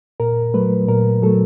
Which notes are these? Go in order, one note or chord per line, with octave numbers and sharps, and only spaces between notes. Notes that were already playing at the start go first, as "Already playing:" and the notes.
A#2 A#4
F#3 A3 B4
A#2 A#4
F#3 A3 A4